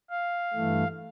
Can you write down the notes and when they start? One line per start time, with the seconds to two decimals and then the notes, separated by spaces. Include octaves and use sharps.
0.10 F5
0.53 G2 E3 A3